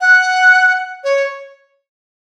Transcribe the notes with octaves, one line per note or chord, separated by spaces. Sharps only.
F#5
C#5